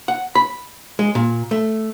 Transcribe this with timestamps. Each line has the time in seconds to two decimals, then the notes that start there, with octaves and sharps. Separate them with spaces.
0.08 F#5
0.35 B5
0.99 G#3
1.15 A#2
1.51 A3